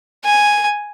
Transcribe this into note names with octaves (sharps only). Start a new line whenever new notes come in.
G#5